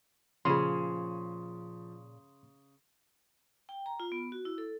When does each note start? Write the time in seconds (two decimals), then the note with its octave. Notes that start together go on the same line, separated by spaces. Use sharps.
0.45 A#2 C#3 F3 G#4 C6 D#7
3.69 G5
3.86 A#5
4.00 F4
4.12 B3
4.32 F#4
4.45 E4
4.58 A4